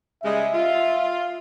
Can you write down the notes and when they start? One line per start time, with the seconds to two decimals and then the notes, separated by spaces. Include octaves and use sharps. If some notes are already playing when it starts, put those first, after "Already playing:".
0.23 C#3 G3 G#3 E5
0.53 F4